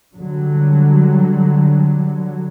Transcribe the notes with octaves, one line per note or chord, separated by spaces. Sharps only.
D3 F#3 G3